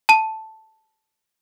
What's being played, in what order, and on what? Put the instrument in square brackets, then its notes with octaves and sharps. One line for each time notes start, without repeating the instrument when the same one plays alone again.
[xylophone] A5 D#7